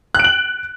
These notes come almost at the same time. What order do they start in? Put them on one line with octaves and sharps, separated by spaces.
F#6 D7 F#7